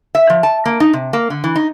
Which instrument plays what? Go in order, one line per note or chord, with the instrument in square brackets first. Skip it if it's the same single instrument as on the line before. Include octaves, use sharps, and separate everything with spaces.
[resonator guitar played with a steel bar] E5
F3
A5
A#3
D#4
C3
A#3
D3
E3
D#4